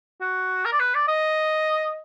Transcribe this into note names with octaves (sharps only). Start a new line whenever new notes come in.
F#4
A#4
D5
B4
D5
D#5